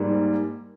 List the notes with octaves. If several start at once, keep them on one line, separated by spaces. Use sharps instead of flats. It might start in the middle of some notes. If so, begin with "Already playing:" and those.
Already playing: G#2 G3 A#3